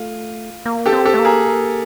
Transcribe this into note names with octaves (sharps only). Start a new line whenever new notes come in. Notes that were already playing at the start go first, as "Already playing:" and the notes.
Already playing: A3 F4
A#3
G4 A4
C4
G4 A4
A3
A#3
G#4 A#4